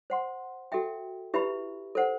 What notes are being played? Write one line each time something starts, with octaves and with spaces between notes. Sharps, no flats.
C5 F#5 C6
F#4 A4 E5 G5
E4 G4 B4 E5 B5
A4 C5 F#5